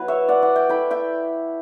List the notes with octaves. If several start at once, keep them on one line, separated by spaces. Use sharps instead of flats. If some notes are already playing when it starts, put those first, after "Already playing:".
Already playing: F#3 B3 E4 B4
C#5 E5
D5 F#5
D5 F#5
E5 G5
A3 E4 G5 B5
E5 G5